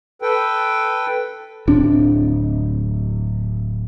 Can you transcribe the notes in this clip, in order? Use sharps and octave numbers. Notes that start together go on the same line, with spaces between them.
A4 B4 G5
D1 C4 D4